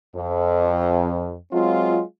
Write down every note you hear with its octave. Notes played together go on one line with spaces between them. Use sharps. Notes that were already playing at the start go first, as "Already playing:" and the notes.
F2
F#3 G#3 C4 F4